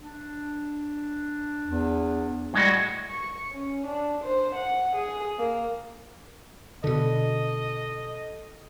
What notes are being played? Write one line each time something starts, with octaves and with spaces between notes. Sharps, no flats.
D4
E2
A2 G3 G#3 F#4
C#6
C#4
D4
C5
F#5
G#4
A#3
B2 D3 A4 D#5